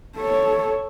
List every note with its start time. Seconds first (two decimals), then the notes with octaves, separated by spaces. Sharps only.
0.17 A4 C#5